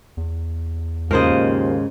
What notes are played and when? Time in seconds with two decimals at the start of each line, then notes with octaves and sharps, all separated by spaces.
0.17 E2
1.11 D#2 G#2 C#3 F4 A#4 C5 D#5